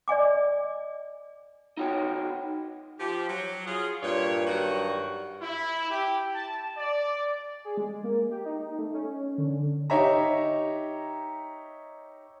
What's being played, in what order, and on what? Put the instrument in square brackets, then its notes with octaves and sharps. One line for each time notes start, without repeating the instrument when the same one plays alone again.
[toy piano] D5 D#5 G#5 D6
[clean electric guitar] D#4 F#4 C#5 G5
[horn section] F3 G4
F#3
F4 F#4 G#4
[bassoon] G2 [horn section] A#2 C#5
[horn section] D#3 F#3 F#4
[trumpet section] E4
G4
A5
D5
[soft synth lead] G#4
G#3
A#3
G4
D#4
A3
C#4
D3
[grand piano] D#4 G4 C#5 E5 A#5